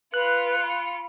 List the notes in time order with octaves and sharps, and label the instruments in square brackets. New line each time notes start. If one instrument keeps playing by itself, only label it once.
[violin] F4 C#7 [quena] B4 [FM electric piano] F#6
[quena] B5